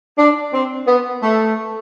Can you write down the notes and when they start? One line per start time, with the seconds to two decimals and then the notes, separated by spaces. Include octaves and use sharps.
0.18 D4
0.52 C4
0.86 B3
1.21 A3